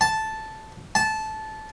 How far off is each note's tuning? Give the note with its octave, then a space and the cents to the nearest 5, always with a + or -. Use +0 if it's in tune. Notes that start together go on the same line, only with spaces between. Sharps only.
A5 -5
A5 -15